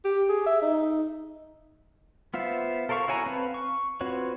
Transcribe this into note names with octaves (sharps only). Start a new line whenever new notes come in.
G4
G#4
E5
D#4
B3 F4 C5 E5
A4 A#4 C5 F5 C#6
E4 F#4 C#5 G#5 A#5
C4 B4 F5 A5 B5
C#6
C4 F4 F#4 B4 C#5